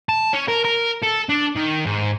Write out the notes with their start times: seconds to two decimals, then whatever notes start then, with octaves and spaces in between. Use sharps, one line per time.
0.09 A5
0.33 C#4
0.48 A#4
0.65 A#4
1.02 A4
1.29 D4
1.56 D#3
1.86 G#2